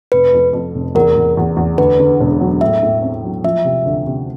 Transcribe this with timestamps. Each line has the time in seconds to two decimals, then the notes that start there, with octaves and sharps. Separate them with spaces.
0.12 F1 B4
0.33 F2
0.53 F2
0.75 F1
0.95 E2 A#4
1.16 E2
1.37 E2
1.57 E2
1.78 D2 B4
2.00 D3
2.20 E1
2.40 F#3
2.61 A2 E5
2.83 A2
3.02 C4
3.23 F#3
3.44 F3 E5
3.65 C3
3.86 D2
4.06 C3